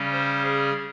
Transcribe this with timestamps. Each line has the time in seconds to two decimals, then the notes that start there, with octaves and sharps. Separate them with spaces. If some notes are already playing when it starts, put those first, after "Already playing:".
Already playing: C#3 G3 C#4
0.12 C5
0.42 G#4